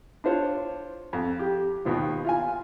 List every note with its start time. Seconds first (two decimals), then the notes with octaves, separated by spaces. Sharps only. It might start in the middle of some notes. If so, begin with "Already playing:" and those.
0.24 D4 F4 C5 C#5
1.13 F2
1.39 G4
1.85 D#2 B2 F3
2.25 F4 F5 G#5